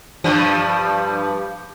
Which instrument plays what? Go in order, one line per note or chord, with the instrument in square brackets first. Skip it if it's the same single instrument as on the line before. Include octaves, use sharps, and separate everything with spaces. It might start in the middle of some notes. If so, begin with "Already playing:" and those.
[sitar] G2 F3 G3